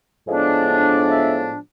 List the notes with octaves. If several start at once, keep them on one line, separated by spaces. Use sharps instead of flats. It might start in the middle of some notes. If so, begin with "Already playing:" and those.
A2 F3 G#3 B3 D4
E5